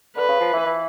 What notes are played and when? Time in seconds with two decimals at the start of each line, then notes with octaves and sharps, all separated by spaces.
0.16 D3 B4
0.28 C#3
0.41 F3
0.53 E3
0.66 E3